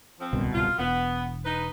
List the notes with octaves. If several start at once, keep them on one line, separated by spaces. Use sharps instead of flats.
F3 C4
D1 C2 B2
F4
E1 B3
D#4 B4